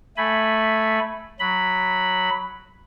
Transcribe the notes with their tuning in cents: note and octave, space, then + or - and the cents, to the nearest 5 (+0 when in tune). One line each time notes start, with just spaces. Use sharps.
A3 +0 G#5 +0 B5 +0
F#3 +0 B5 +0